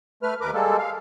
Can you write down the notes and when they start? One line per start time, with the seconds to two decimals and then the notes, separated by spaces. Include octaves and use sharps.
0.23 A3 B4 F6
0.41 D#2 A#4 B4 D6
0.54 G3 G#3 A#3 A4
0.78 F5